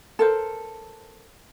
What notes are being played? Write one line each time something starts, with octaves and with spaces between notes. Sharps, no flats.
A4 A#4 C5